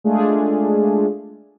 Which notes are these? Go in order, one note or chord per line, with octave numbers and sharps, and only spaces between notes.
G#3 A3 D4 F4 G#4